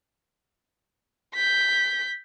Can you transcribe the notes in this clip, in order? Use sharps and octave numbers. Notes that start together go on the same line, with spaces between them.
G6 B6